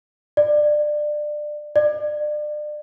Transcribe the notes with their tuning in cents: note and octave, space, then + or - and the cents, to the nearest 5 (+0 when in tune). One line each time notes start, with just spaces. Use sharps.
D5 +25
D5 +35